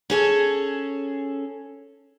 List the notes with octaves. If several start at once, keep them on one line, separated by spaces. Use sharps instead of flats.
C#4 G#4 A4